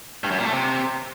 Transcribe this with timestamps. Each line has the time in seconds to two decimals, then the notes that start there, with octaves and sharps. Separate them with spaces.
0.24 G2
0.31 F#2
0.38 A#2
0.45 A3
0.52 C3